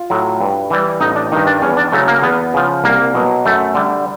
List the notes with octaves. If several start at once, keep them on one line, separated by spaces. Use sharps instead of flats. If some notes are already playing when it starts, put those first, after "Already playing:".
Already playing: F4
A2 F#3
G2
E3 G3
A1 D#4
D4
G2 D#3 D#4
D4
E2 C#4
D4
C#3 F#3 A3
A#3
E2 B3
C#3 F3
C2 A#3
B2 F#3
F#2 A3
D3 G3